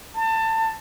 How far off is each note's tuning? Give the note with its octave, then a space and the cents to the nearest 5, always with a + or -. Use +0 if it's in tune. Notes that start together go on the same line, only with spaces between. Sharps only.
A5 +25